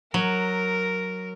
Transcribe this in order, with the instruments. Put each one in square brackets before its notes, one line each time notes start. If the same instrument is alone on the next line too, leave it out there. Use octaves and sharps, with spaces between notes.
[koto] F#3 [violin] A#4